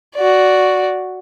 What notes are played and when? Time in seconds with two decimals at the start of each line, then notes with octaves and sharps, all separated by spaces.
0.15 F#4 D5